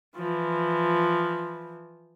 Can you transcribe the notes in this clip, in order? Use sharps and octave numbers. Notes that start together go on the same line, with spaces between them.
E3 F3